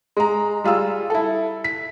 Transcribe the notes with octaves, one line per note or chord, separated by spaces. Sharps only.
G#3 A#5
G3 F4 G#4 E6
E4 A4
B6